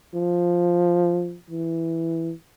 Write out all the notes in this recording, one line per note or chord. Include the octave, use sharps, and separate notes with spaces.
F3
E3